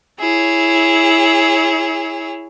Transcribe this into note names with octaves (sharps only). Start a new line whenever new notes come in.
E4 G#4 C#5